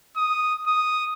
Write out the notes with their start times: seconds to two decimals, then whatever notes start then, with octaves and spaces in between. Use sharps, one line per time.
0.17 D#6
0.67 D#6